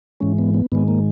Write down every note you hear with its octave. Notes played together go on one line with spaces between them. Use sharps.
G#2 E3 G#3 C#4
B3
B3
G#2 D#3 G#3 B3
A#3